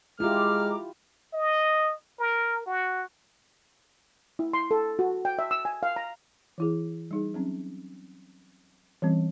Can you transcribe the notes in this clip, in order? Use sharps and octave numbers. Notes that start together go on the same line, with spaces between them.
G#3 E4 F4 G4 A#5 D6 F6
D#5
A#4
F#4
E4
C6
A4
F#4
G5
E5
E6
G#5
F5
A#5
E3 E4 G#4
G3 D#4 G#4
F#3 C4 C#4
E3 G3 C4 C#4